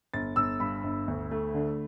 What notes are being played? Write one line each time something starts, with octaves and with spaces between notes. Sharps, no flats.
G1 A6
G1 E6
G2 B5
G1
D2
A3
D3